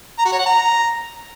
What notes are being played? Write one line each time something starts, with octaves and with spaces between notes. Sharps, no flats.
A#5
F#4
C#5
F#5
A#5